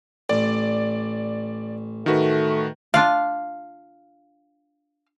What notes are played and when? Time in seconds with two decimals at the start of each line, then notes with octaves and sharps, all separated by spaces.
0.30 A1 D5
2.06 D#3 A3 F#4 B4
2.94 D4 F4 D5 F5